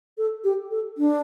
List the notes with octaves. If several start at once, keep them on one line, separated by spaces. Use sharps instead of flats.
A4
G4
A4
D4